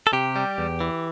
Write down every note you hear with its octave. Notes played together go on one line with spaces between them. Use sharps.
A4
C3 G4
G3
E2
E3